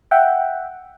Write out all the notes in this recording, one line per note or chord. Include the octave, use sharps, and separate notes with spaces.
E5 F#5 G5